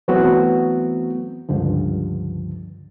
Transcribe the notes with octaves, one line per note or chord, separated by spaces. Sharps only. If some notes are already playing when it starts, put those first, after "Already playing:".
E3 F#3 A3 B3 C4 F#4
C#2 G2 D3 F3